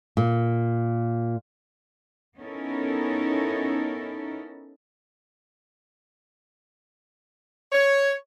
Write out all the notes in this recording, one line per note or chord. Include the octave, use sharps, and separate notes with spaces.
A#2
B3 C#4 D#4 E4 A4 A#4
C#5